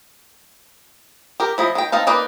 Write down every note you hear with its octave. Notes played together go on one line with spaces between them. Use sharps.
G4 A#4
F3 E4 D#5
D#3 G5
C4 D#4 F5 A5
A#3 D#4 B4 D5